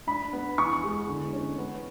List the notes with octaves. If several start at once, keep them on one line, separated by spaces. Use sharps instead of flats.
D4 B5
B3
E2 C#6
G#3
D3
C#4
B3